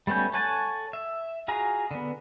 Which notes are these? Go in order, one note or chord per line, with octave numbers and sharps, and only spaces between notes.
G3 A3 B3 C#4 G6
A4 C#5 F#5 G#5 A5
E5
F4 F#4 G#4 F5 A#5
D3 B3